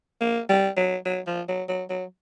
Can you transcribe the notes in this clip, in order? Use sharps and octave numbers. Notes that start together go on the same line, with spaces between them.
A#3
G3
F#3
F#3
F3
F#3
F#3
F#3